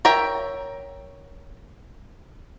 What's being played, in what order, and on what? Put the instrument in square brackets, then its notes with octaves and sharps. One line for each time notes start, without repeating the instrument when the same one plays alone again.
[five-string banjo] A#4 C#5 E5 G5